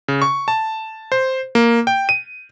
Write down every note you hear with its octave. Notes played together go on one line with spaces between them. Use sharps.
C#3
C#6
A5
C5
A#3
G5
D#7